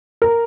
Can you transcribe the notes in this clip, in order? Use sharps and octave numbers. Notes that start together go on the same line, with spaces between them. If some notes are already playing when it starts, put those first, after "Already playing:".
A#4